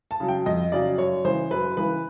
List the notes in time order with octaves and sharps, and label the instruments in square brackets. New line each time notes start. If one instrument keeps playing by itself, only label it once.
[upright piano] A5
C#3 F#3
G5
F2 D#5
C#3 F#3 D5
F#2 C#5
C#3 E3 C5
F#2 B4
C#3 E3 B4